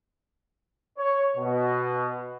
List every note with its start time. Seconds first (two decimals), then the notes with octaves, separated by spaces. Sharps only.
0.98 C#5
1.37 B2